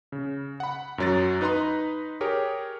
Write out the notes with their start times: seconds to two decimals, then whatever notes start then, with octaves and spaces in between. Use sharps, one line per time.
0.12 C#3
0.60 F#5 B5
0.98 F#2 F#3 A6
1.41 D#4 B4 A#5 C6
2.21 G4 G#4 A#4 C#5